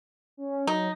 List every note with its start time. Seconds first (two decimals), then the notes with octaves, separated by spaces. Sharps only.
0.37 C#4
0.67 F#3 D#4